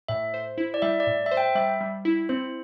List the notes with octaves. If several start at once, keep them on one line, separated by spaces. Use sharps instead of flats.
A2 E5
C5
E4
D5
G3 E5
D5
A2
E5
C5
G5
G3 E5
G3
E4
C4 C5